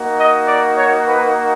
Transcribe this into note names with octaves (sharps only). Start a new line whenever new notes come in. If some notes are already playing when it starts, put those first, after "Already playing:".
Already playing: A#3 D#4 F#4
D#5
D5
C#5
B4